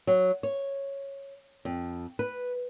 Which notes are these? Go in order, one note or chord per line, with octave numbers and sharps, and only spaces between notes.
F#3
C#5
F2
B4